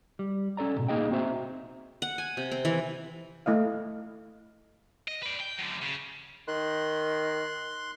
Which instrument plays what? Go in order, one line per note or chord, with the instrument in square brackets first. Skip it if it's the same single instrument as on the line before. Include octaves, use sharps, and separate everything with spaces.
[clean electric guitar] G3
C#4 A4 D5 A#5
C2 G#2 B2
C2 A#3 D#4 G#4 D#5 G5
C4 F#4 C5 E5 A#5
[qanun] F#5
G#5
C3
C4
E3
[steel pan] A3 E4 D#5 F5
[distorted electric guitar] D#5
B4 D5
G5
F#2 D3
C#3
[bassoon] D#3 [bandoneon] C6 F#6